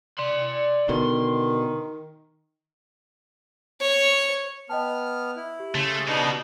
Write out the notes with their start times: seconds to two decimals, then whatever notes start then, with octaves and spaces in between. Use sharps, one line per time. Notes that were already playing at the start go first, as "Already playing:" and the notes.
0.18 D5 C6
0.89 B2 D3 D#3 C6
3.81 C#5
4.70 B3 D#5 G5 A5 F6
5.36 E4
5.60 G4
5.75 C#3 A3 C6
6.08 B2 B3 D4 D#4